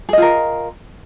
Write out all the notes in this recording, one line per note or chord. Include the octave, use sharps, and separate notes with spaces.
F4 G#4 A#4 D#5